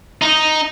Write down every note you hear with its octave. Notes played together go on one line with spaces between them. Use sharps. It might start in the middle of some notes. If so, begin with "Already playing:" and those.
D#4